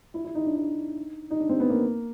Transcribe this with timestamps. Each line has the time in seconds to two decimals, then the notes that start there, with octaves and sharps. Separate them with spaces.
0.14 E4
0.25 E4
0.35 D#4
0.45 D4
0.55 D#4
1.31 D#4
1.39 D4
1.49 C4
1.60 B3
1.70 A#3